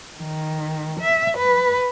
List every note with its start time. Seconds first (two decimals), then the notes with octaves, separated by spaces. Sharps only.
0.18 D#3
1.00 E5
1.37 B4